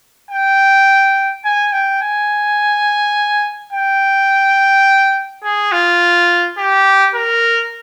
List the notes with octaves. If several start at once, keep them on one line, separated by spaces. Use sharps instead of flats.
G5
G#5
G5
G#5
G5
G#4
F4
G4
A#4